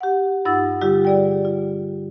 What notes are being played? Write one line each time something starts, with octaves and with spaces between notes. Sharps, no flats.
G4 F#5
G2 D#4 F4 F#5 E6 A6
D3 G3 F4 G4
G#4 D5 G5
F4